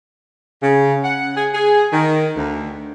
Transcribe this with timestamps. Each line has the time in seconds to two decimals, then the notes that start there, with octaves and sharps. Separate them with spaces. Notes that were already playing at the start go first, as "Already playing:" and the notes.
0.62 C#3
1.04 F#5
1.36 G#4
1.54 G#4
1.93 D#3
2.37 D2